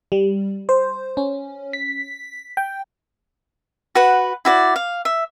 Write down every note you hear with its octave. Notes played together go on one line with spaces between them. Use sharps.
G3
C5
C#4
B6
G5
F#4 B4 F#5
E4 F#4 D5
F5
E5